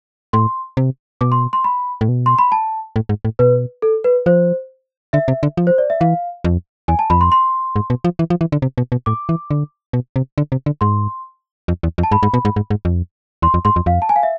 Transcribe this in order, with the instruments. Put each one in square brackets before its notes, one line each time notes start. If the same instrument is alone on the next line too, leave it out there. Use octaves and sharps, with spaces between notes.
[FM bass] A2 [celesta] C6
[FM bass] C3
[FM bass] B2 [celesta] D6
[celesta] C6
C6
B5
[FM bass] A2
B2
[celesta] C6
B5
A5
[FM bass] A2
G#2
A2
[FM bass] B2 [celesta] B4
[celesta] A4
B4
[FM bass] F3 [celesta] C5
[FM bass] D3 [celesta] E5
[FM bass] C3
D3
F3
[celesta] C5
D5
E5
[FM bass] E3 [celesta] F5
[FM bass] F2
[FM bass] E2 [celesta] G#5
[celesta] A5
[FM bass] F2 [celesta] B5
[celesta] C6
C6
[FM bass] G#2
B2
F3
E3
F3
E3
D3
C3
B2
B2
[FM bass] A2 [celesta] D6
[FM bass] E3
D3
B2
C3
D3
C3
D3
[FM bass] G#2 [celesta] C6
[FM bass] F2
E2
F2
[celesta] A5
[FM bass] G#2 [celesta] B5
[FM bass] G#2
B2
G#2
G#2
G#2
F2
[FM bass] E2 [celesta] C6
[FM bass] F2
[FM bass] G#2 [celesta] C6
[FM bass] F2
[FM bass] F2 [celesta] F5
[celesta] A5
G#5
F5
E5